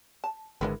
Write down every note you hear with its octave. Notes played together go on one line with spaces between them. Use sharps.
A5
G#1 D3 G#3 E4 A#4 B4